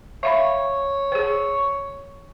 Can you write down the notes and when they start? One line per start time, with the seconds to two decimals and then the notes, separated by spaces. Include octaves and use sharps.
0.23 C#5 E5 F5 B5
1.12 G#4 C5